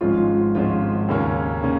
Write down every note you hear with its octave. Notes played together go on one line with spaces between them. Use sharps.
G#1 G#2 F3 C#4 F4
G#1 G#2 F3 C#4 F4
D#2 C#3 A#3 C#4
C#3 A#3 C#4